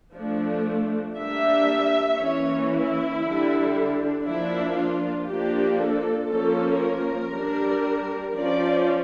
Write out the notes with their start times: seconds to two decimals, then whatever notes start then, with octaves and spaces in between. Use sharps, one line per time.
0.15 F3 A3 D4
1.17 G3 A#3 D4 E5
2.19 E3 A#3 C#4 C#5
2.71 E4
3.22 D3 G3 D4
3.74 D4
4.25 F3 A#3 D4 E4
4.76 F4
5.27 F3 A#3 D4 G4
5.79 A4
6.30 F3 A#3 C#4 A4
6.82 A#4
7.32 G3 D4
8.35 F3 C#4 D5